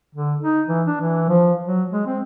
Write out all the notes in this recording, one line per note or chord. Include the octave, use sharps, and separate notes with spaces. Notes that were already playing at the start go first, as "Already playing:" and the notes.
D3
D#4
E3
D4
E3
F3
F#3
G#3
C4